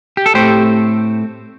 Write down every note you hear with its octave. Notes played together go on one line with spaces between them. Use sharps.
G4
A4
A2 A3 C4 G4 C5